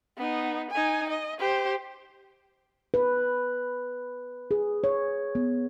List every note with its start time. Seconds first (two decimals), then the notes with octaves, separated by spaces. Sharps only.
0.17 B3 D#4
0.71 D#4 G#5
1.09 D#5
1.39 G4 C5
2.94 B4
4.51 G#4
4.84 C#5
5.35 B3